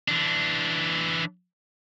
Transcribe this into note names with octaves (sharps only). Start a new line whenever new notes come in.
E3 D4